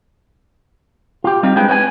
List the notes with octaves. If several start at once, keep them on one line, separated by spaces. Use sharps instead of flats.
F4 G4
G3 C4 D#4 F4
G#3 C4 D4 G#4 B4 G5
B4 C#5 G5 G#5